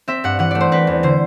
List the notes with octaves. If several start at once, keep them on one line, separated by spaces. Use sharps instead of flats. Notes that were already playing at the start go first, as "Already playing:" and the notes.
C4 E5
G2 F#5
E3 F#5
A3 D5
C5
C4 B4
E2
D3 C5